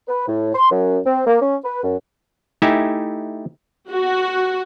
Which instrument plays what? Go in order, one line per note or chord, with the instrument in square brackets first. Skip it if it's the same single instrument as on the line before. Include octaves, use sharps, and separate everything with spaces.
[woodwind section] B4
A2
C6
F#2
C4
A#3
C#4
B4
F#2
[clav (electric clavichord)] A3 D#4 E4 G4 E5 G#5
[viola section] F#4